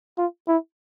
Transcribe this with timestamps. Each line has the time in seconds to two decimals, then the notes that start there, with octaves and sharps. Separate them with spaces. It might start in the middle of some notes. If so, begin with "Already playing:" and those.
0.18 F4
0.48 E4